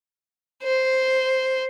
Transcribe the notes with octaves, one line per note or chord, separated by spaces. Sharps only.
C5